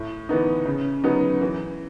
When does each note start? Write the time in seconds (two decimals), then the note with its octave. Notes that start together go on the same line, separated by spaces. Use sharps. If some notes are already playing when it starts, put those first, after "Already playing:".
Already playing: A2
0.29 E3 B3 D#4
0.65 C#3
1.04 F#3 B3 D#4
1.41 E3